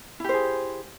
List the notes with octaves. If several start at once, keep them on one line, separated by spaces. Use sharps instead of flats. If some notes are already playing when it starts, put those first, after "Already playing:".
E4 G4 G#4 C5